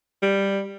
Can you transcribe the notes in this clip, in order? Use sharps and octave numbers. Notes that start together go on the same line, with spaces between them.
G3